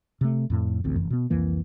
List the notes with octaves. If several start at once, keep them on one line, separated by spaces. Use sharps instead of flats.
C3 A3
F2 A2
A1 D2 C4
F1 F#2 E3
B2 B3
C2 F2 E3 A#3